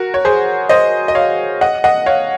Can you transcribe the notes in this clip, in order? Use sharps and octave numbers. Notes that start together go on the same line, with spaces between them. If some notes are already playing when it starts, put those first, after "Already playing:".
Already playing: F#4 A#4
C#5
G#4 C5
C5 D#5
D#5
C#5 F5
D#5 F#5
D#5 F#5
C#5 F5